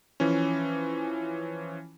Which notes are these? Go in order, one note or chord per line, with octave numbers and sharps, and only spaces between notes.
E3 F3 C#4